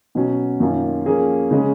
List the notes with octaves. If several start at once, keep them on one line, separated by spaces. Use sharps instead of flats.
B2 F#3 C#4 F#4
F#2 D#3 A#3 C#4 F4
F3 A#3 C#4 G#4
C#3 G#3 C#4 G#4